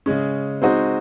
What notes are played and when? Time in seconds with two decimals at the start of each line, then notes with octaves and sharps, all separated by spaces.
0.06 C#3 G#3 C#4
0.62 G#3 C4 D#4 F#4 C5